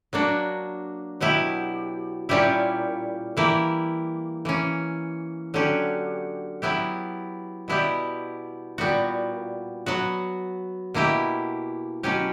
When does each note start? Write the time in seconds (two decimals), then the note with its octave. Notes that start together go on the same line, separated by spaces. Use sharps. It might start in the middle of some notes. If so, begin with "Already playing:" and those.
0.13 F#3 A#3 D4 F#4
1.20 B2 F#3 B3 E4 G4
2.29 A#2 G3 C#4 E4 G4
3.37 E3 A#3 E4 G4
4.45 E3 A#3 C#4
5.54 D3 F#3 C#4 G4
6.62 F#3 B3 E4 G4
7.68 B2 G3 B3 E4 G4
8.78 A#2 G3 B3 F#4
9.86 F#3 B3 F#4
10.94 B2 A#3 E4 G4
12.03 B2 F#3 C#4 G4